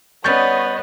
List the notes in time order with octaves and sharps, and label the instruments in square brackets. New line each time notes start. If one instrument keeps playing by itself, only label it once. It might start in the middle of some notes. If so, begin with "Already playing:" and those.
[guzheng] G3 C#4 [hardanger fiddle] B3 [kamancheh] C#5 D#5 [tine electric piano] C#6 G6 A6